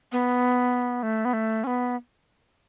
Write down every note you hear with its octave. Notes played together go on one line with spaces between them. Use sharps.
B3
A3
B3
A3
C#4
B3